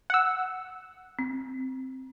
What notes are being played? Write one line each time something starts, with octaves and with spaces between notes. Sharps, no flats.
F#5 E6
C4